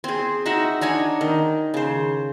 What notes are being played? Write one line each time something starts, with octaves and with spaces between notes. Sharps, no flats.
C4 G#4
D#4 F#4 E5 F#5
D4 D#4 C#5 G#5
D#3
C#3 C5